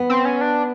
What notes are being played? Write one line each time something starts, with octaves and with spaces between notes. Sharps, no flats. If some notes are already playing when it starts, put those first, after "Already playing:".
Already playing: B3
C4
C#4
D4